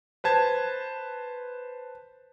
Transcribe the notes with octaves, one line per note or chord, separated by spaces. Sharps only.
B4 C5 A5 G#6